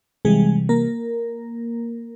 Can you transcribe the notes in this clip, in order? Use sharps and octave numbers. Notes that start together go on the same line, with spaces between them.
C3 E3 G3 G#3 G#4
A#3 A#4